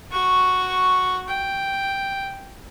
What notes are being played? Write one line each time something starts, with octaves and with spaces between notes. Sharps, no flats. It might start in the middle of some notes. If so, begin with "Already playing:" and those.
F#4 C#6
G5